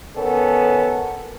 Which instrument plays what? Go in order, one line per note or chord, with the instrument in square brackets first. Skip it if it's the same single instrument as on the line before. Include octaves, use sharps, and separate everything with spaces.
[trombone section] D#3 B3 C#4 A4